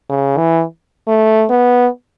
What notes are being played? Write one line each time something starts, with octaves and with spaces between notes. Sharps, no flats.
C#3
E3
A3
B3